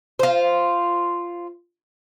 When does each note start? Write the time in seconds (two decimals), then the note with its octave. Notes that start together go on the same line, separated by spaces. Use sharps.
0.19 F4 C5